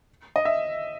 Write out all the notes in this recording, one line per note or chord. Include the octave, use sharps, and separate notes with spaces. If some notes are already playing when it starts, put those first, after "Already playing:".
D#5
E5